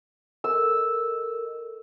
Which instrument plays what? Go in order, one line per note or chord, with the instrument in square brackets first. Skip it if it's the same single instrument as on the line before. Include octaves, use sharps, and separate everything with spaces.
[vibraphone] A4 A#4 D#5 [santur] E6